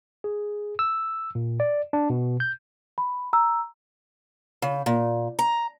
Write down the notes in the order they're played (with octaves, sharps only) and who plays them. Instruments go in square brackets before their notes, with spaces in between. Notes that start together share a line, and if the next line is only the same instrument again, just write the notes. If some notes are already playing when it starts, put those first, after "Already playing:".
[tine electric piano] G#4
E6
A#2
D5
D4
B2
G6
[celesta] B5
A#5 E6
[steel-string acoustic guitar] C#3
A#2
A#5